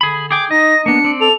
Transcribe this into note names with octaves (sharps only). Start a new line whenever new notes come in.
D3 G#4 B5
G#4 G5 G#5 D6
D#4 D#5 A#6
A#3 B3 D4 C#7
C4 D5
A4 F7